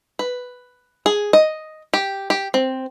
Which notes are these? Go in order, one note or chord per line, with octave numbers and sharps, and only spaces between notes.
B4
G#4
D#5
G4
G4
C4